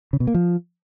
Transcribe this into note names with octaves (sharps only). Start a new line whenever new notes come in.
C#3
B2
A#3
F3